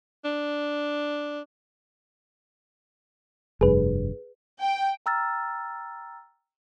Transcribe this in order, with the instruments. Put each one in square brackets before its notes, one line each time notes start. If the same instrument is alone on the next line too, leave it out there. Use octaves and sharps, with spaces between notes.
[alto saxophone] D4
[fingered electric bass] F1 G2 [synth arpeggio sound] G#4 B4
[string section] G5
[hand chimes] G5 A#5 E6 F6 A6